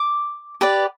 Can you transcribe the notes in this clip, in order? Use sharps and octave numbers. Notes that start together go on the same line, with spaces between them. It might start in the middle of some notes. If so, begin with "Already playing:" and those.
Already playing: D6
G4 B4 D5